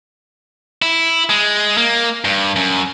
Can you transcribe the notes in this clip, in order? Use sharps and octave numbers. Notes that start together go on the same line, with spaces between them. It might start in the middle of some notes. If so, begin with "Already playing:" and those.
E4
G#3
A#3
G2
F#2